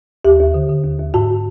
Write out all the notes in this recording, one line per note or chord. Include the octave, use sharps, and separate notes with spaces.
D#2 G4
D#2
D3
D3
D#2
D#2
G#2 F#4